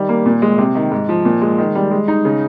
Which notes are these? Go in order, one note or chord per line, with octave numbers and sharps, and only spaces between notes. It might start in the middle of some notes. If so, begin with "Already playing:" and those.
Already playing: D#3 G3
A#3
A#2
G#3
C3
D#3
G#2
F3
A#2
G#3
D#3
G3
G#3
D#4
C#3